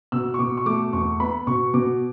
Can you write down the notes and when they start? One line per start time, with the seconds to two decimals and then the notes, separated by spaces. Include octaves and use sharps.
0.12 B2 E6
0.34 C#6
0.39 B2 D6
0.57 C#6
0.66 A3 D6
0.93 E2 C#6
1.20 B3 B5
1.47 B2 C#6
1.74 B2 D6